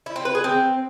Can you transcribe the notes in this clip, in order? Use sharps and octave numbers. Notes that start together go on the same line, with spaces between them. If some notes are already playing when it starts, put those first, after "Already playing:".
E4
C4
B4
G#4
C4